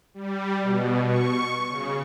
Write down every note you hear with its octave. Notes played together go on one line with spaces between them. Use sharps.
G3
B2
C#6
C#3